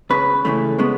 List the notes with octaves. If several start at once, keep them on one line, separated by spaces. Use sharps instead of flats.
C#2 C#3 B4
C#2 C#3 E3 A3
C#3 G#3 B3